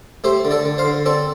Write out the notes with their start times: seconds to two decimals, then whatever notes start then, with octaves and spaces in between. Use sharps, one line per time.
0.24 A3 G4 C5
0.45 D3
0.51 A4 D5
0.65 D3
0.78 C5 F5
0.85 D3
1.06 C4 A4 D5